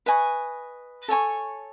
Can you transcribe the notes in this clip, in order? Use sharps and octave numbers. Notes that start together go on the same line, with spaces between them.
B4 D#5 G#5 C#6
A4 C#5 G#5 C#6